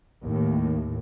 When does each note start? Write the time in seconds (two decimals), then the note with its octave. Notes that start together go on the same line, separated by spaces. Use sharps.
0.22 D#2 A2